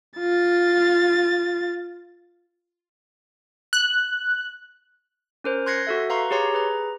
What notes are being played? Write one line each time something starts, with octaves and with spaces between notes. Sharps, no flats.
F4 A6
F#6
C#4 A#4 C5
C6 F#6 G#6 A#6 C7 C#7
F#4 A4 E5
B4 F5 A#5 C6 C#6
G4 G#4 C#5 A#5 C6
G#4 B4 A#5